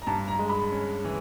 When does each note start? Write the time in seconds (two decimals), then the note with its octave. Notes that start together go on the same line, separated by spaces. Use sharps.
0.02 A#5
0.07 G2 A5
0.28 A#5
0.39 G#3
0.49 B5
0.72 C#4
1.05 E3